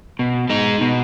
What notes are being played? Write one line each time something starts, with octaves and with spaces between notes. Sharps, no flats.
B2
G#3 D#4
B2